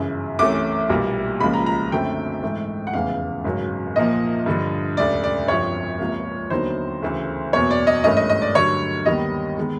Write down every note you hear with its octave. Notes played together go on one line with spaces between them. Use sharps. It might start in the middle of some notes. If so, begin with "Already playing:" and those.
Already playing: G1 F#2 C#3 E3
C2 C3 E3 A3 C#4 D6
B1 A#2 G3 A#3
C#2 C#3 F3 A#3 B5
A#5
A#5
F#2 D3 F#3 A3 C4 G5
G#2 E3 A3
F#5
F1 E2 C#3 E3 F5
G#1 F#2 C#3 F#3
C2 A#2 F3 A#3 D#5
G2 D3 F3
E1 D2 C#3 D5
D5
G1 F2 C3 F3 C#5
C#2 C3 F3 A#3
D#2 D3 F#3 B3 D#4 C5
D2 C#3 E3 A3
F#1 E2 B2 C#5
D5
D#5
G#1 G2 E3 A3 C#4 D#5
D#5
D#5
D5
G2 D3 F#3 A3 C#5
D#2 D#3 G3 B3 D#5
D#3 G#3 B3